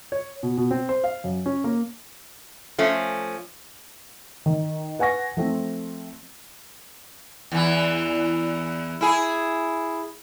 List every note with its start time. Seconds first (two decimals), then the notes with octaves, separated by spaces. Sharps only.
0.12 C#5
0.43 B2
0.57 B2
0.71 C4
0.89 C5
1.04 F5
1.24 F#2
1.46 C#4
1.64 A#3
2.78 F3 A3 C#4
4.46 D#3
4.99 B4 F#5 G#5 C#6 A#6
5.37 F3 A3 C4
7.52 E2 E3
9.01 E4 G#4